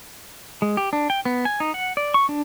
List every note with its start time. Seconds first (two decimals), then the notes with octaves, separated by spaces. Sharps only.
0.62 G#3
0.77 G4
0.93 D4
1.10 G5
1.25 B3
1.45 G#5
1.60 D#4
1.74 F#5
1.97 D5
2.14 C#6
2.29 D4